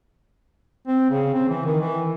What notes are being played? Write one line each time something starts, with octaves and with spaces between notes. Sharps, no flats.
C4
C#3
C4
E3
D#3
E3